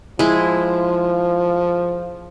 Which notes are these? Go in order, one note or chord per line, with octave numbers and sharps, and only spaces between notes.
F3 G#3 E4